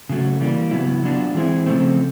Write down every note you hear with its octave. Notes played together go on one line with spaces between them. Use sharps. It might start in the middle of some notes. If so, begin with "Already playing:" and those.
C#3 F#3 A3
E3 G3 A#3
C#3 F#3 B3 E4
F#3 B3 D4 F4
E3 G#3 C4 E4
C#3 F3 A3 C4